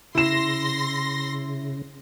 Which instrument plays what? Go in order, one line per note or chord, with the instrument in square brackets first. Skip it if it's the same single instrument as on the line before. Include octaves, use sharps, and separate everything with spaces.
[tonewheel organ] C#3 [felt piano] E4 E7 [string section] C6 A#6